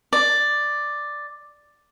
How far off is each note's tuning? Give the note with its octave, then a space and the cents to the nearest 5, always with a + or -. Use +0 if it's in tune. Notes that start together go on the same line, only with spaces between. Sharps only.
D5 +5